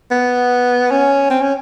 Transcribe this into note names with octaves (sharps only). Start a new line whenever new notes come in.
B3
C#4
C4
C#4